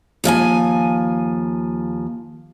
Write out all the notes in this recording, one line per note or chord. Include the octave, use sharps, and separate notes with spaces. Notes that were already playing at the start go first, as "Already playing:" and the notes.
D#2 F3 D#5 G#5